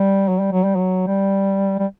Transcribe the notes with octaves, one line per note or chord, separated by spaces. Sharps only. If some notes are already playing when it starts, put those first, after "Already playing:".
Already playing: G3
F#3
G3
F#3
G3
F#3
G3
G3